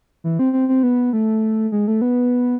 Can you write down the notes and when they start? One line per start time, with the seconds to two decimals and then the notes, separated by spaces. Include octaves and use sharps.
0.24 E3
0.39 C4
0.53 C4
0.69 C4
0.83 B3
1.13 A3
1.72 G#3
1.88 A3
2.02 B3